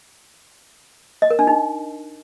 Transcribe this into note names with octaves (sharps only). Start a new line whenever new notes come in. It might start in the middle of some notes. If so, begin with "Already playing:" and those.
D#5
A#4
D4
D#4